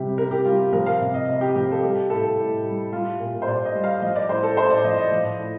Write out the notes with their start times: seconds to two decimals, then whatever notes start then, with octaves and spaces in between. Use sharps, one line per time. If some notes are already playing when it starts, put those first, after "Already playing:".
Already playing: C3 G3 G4
0.18 C3 A#4
0.31 G4
0.45 G3 F4
0.59 G4
0.73 F3 A#4
0.86 F5
1.01 C3
1.14 D#5
1.28 C3
1.41 G4
1.56 F3 G4
1.71 A4
1.83 G3 G4
2.10 A2 A4
2.37 A2
2.65 G3
2.92 G3 F4
3.20 A#2
3.42 C5
3.47 A#2 D5
3.65 D#5
3.74 G3
3.84 F5
4.02 F3 D#5
4.16 D5
4.29 A2 C5
4.43 A4
4.57 A2 C5
4.70 D5
4.84 F3 D#5
4.97 D#5
5.11 F3
5.39 A2